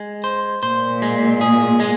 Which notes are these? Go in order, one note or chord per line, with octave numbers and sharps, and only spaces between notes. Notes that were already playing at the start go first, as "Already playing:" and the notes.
Already playing: G#3
C5
A#2 C5
G#3
G#4
G#3